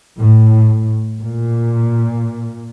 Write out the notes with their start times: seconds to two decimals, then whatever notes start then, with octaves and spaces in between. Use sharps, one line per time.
0.19 A2
1.21 A#2